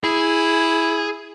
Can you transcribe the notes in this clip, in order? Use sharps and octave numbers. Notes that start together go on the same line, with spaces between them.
E4 G#4